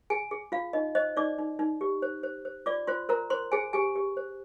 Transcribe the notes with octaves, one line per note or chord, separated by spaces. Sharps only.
G#4 G#5
G#4
F4 F5
D#4 D#5
C5 D#5
D#4 D5 D6
D#4
D#4
G4
C5
C5
C5
F4 D5 D6
F4 C5 C6
A#4 C5 A#5
C5 C6
G#4 C5 G#5
G4 G#4 G#5
G4
C5